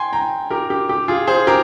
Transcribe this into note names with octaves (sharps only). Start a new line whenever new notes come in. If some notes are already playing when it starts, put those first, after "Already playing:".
Already playing: G5 G#5 C6
G5 A#5
G4 A#4
G4
G4
F4 G#4
G#4 C5
G4 A#4